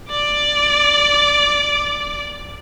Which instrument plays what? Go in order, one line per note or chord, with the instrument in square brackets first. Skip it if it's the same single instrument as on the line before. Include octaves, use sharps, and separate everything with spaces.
[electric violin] D5 D6